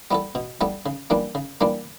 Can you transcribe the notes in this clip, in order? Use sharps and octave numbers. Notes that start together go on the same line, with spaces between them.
G3 B3 E4 A4
B2
G3 B3 E4 A4
C#3
E3 G3 A#3 D4
C#3
E3 G3 A#3 D4